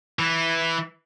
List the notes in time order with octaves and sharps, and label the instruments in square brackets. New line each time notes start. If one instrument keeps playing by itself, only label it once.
[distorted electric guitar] E3